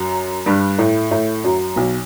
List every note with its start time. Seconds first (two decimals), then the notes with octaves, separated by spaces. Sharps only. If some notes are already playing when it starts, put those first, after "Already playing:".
Already playing: F#2 F#3
0.46 G2 G3
0.78 A2 A3
1.11 A2 A3
1.44 F#2 F#3
1.76 B1 B2